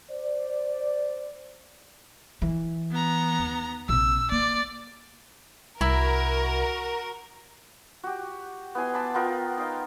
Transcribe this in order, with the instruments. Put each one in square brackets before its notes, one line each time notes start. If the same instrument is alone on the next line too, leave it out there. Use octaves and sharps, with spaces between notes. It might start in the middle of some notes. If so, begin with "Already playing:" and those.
[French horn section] C5 D5
[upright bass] E3
[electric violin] B3 A#5
[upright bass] D#2
[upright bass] A#1 C3 [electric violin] E6
[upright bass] A#3 [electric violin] D5
[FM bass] C2 [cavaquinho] E4 [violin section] F#4 A#4
[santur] F#4 G4
B3 E4 G#5 C6
A5 B5 D6
B3 F4 A#4 G5
D#4 F5 G5